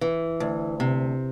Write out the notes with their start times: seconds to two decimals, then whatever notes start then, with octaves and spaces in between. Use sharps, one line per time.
0.01 E3
0.40 D2
0.80 C3